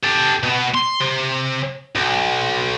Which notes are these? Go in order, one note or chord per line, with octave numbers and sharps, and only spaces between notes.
G4 A4
B2 B3
C6
C3
B1